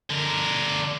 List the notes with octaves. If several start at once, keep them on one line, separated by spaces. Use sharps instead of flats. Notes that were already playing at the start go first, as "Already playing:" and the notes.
D3 A#4